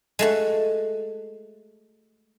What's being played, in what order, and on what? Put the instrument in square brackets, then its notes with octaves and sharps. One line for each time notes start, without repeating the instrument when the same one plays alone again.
[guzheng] G#3 A3 F#4